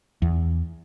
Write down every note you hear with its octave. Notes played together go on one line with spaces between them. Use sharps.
E2